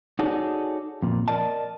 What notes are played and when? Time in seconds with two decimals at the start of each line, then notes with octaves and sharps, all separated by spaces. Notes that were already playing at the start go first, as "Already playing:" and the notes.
0.19 D#4 F#4 G#4 A4 C#5 D5
1.02 F2 A#2
1.28 A#4 D5 D#5 A5